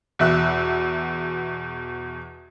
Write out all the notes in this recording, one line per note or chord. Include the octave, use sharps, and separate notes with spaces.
E2 B2 E5 F#6